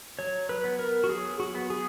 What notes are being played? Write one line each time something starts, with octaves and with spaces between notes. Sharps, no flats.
F#3 C#5
B4
B3
A#4
F#4
F#3 G#4
F#4
B3
G#4